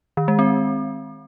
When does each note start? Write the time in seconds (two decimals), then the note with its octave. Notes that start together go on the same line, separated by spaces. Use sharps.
0.17 D#3
0.28 G#3
0.39 C4